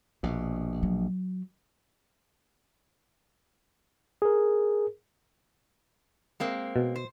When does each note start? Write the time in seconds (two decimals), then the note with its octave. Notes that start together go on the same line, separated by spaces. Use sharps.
0.23 A#1 B2
0.83 F#3
4.22 G#4 A#4
6.40 G#3 A#3 C4
6.76 B2
6.96 C5